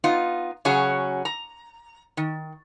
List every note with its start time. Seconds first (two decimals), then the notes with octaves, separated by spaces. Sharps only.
0.04 B3 D#4 F4
0.65 C#3 F#3 C#4 F#4 G#4
1.25 A#5
2.17 D#3